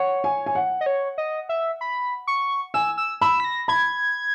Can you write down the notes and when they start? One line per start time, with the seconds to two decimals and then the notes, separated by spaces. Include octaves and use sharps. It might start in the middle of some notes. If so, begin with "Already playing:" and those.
Already playing: C#5 F#5
0.24 G#5
0.46 G#5
0.55 F#5
0.81 D#5
0.86 C#5
1.18 D#5
1.49 E5
1.81 B5
2.27 C#6
2.74 G#5 E6
2.98 E6
3.21 B5 E6
3.40 B6
3.44 A#6
3.68 B5 G#6